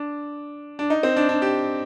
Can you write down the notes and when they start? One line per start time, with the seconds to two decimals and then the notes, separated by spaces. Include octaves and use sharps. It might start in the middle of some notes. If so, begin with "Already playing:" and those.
Already playing: D4
0.79 D4
0.90 D#4
1.03 C4
1.17 D4
1.29 D4
1.42 G4